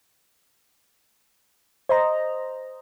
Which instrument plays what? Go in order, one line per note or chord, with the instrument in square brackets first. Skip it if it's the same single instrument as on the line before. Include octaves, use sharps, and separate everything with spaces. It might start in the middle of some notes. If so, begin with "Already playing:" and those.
[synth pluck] C5 D#5 A#5